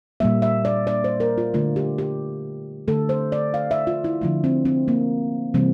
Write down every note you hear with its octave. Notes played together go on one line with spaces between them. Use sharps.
A#2 G3 A#3 E5
E5
D5
D5
C5
A#4
F4
D3 A3 F4
G4
G4
D3 A3 A4
C5
D5
F5
E5
F4
E4
D3 F3 A3 E4
C4
C4
A#3
C3 E3 G3 A#3 C4